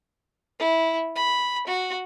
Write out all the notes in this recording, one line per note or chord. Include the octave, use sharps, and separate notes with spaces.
E4
B5
F#4